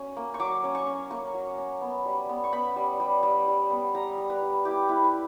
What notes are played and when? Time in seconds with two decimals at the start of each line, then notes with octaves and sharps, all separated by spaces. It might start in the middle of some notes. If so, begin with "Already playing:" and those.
Already playing: F#3 C#4
0.17 A#3
0.34 C#6
0.40 F#3 D6
0.64 C#4
0.75 C#6
0.86 C#4
1.11 A#3 C#6
1.34 F#3
1.58 C#4
1.81 B3
2.05 G3
2.29 B3
2.44 C#6
2.53 B3 B5
2.76 G3
3.00 G3
3.23 G3
3.48 G3
3.71 B3
3.95 G3 A#5
4.18 G3
4.30 B4
4.42 G3
4.65 E4 G4
4.89 E4 B4
5.04 B4